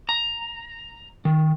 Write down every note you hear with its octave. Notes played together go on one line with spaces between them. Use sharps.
A#5
D#3